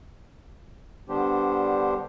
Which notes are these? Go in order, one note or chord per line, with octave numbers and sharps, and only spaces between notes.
D3 G3 B3 D4 G4 C5